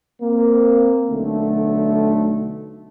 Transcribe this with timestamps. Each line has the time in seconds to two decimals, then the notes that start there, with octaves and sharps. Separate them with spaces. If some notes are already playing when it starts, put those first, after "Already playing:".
0.21 A#3 C4
1.10 B1 D3 A3